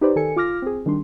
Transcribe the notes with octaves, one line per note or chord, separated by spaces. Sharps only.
D#4 G4 B4 C5 D5
D#3 A4 G#5 C#7
F4 D6 F6 A#6
C4 G#4
D#3 G3 D4 C6